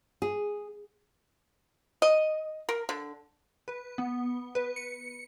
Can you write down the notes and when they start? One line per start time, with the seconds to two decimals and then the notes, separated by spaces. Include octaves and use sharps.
0.22 G#4
2.02 D#5
2.69 A#4
2.89 D3
3.68 B4
3.98 B3
4.55 B4
4.76 C#7